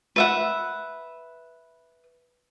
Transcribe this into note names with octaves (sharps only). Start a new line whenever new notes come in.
B4 E5 F#5